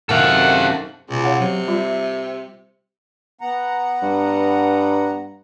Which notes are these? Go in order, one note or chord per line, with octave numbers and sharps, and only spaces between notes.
F#2 C3 D#3 A4 F5 F#5
C#2 B2
C#5 F5 F#5
C3 F#3
G3 F4 E5
B3 F#5 A#5
G2